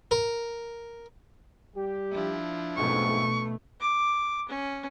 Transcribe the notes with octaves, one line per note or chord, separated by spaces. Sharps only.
A#4
G3 G4
F3 D4 E4
B1 F2 G#2 B2 A3 C#6
D6
C#4